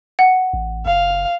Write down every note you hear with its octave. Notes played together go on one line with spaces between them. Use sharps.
F#5
A1
F#1 F5